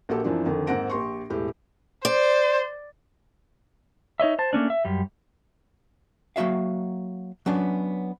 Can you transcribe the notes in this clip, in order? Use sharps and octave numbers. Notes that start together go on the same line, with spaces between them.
A#1 A#3 F#4 G4 A4
F#2 E3 F3 C4 D4
F2 D3 D#3
G#2 A#3 C4 F#5 A#6 D7
A#1 G4 C6 C#6
E1 A2 G4
C5 D5
D#4 C#5 D#5 E5
C5 A5
A3 A#3 C#4 D4
E5
F#2 G3
F#3 A#3 F#4 E5 F5
F#3 B3 C#4 D4